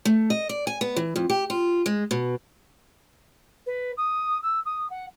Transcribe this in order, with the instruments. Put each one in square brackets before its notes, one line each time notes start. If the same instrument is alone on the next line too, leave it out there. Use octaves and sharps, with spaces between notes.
[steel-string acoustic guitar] A3
D#5
D5
G#5
B3
E3
F2
G4
F4
G#3
B2
[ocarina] B4
D#6
E6
D#6
F#5